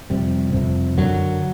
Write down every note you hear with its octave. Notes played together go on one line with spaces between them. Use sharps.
F2 C3 G3
F2 C3
F#2 D3 F#3